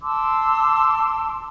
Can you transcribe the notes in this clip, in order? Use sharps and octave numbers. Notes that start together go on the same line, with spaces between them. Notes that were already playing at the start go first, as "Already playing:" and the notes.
A5 C6 D6 E6